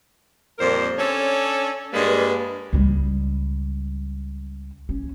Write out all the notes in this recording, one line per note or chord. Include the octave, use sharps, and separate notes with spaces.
F2 A#2 G3 A#4 C5
C#4 D4 A4 C#5
G2 G3 G#3 A#3 B4
C#2 G3
C#4